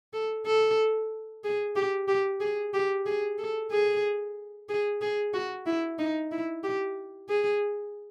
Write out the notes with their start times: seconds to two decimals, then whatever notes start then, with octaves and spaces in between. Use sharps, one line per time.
0.14 A4
0.46 A4
1.44 G#4
1.76 G4
2.08 G4
2.40 G#4
2.74 G4
3.06 G#4
3.38 A4
3.72 G#4
4.69 G#4
5.01 G#4
5.34 F#4
5.66 E4
5.99 D#4
6.31 E4
6.64 G4
7.29 G#4